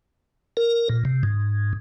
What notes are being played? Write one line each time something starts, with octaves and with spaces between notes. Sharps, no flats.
A#4
A#2
C3
G#2